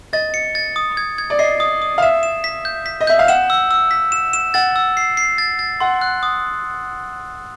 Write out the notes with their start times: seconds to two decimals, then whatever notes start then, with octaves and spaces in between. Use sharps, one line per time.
0.13 D#5 A6
0.34 C#7
0.55 A6
0.76 D#6
0.97 G#6
1.18 G#6
1.30 D5
1.39 D#5 C7
1.60 D#6
1.82 D#6
1.98 F5
2.02 E5 E7
2.23 E7
2.44 B6
2.65 G6
2.86 B6
3.01 D#5
3.07 E5 G6
3.19 F5
3.28 F#5 E7
3.50 E6
3.71 E6
3.91 B6
4.12 E7
4.33 E7
4.54 F#5 A6
4.76 E6
4.97 C7
5.17 C7
5.38 A6
5.59 A6
5.80 F#5 C6
6.02 F#6
6.23 D#6